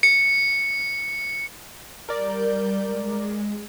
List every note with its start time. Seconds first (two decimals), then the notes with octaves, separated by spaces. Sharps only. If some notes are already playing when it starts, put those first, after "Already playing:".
0.03 C#7
2.09 G3 A#4 D5 G6
2.83 G#3